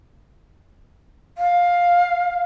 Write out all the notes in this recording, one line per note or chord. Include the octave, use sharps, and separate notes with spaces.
F5